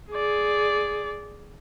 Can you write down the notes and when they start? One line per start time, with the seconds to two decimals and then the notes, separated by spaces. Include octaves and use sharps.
0.11 G#4 D5